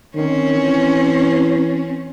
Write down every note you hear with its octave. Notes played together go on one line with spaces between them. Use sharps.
D#3 C4 C#4
E3